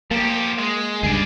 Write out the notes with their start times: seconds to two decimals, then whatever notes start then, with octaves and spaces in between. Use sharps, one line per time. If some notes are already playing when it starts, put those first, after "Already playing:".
0.11 F3 A#3 G4
0.58 G#3
1.03 C#2 G2 G#4 D5